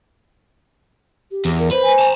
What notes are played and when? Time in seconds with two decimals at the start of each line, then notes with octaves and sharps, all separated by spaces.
1.31 G4
1.45 E2
1.59 A#4
1.71 B4 C5
1.84 G#5
2.00 A5 A#5